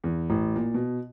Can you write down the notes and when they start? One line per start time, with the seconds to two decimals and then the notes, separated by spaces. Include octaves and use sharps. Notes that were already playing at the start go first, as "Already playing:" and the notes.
0.04 E2
0.30 A1
0.56 A#2
0.74 B2